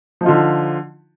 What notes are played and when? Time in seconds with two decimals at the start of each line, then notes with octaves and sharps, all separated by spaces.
0.21 F3
0.23 D#4
0.26 F4
0.28 D3